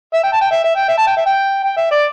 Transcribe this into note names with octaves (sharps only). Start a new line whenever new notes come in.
E5
G5
A5
G5
E5
E5
G5
E5
A5
G5
E5
G5
G5
E5
D5